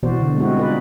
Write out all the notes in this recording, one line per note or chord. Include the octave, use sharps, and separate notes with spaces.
B2 E3 B3 F#4 C5 D5
D3
G3 G#3 C4 E4 F#4
D#4 F4 G#4 B4 D5